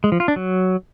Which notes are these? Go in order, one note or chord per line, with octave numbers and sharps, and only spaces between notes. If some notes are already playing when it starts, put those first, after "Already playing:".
G#3
F3
F4
D4
F#3